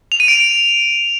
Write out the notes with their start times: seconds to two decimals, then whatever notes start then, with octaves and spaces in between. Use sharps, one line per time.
0.12 F7
0.20 D#7
0.28 D7